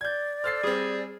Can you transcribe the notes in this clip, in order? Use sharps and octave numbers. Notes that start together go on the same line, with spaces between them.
D5 G6 G#6
A4 C5 F6 A6 C7
G3 C4 G#4